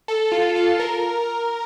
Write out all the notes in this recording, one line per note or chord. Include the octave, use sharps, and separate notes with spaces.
A4
F4
A4
A#4